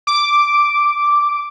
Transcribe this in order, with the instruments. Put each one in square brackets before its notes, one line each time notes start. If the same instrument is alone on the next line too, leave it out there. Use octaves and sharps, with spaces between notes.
[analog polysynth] D6